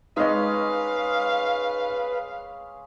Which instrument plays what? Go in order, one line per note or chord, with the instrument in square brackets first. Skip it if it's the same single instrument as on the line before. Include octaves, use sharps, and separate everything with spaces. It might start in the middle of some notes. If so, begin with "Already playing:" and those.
[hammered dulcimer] G#3 C#4 [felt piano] D#4 D#5 [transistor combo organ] B4 [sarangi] F5